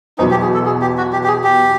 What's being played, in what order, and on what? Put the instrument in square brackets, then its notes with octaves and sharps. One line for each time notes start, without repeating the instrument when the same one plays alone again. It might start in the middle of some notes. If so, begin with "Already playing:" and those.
[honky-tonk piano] E2 B2 F#3 [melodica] D#4
[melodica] G4
G#4
A4
G#4
G4
F#4
G4
G4
G#4
G4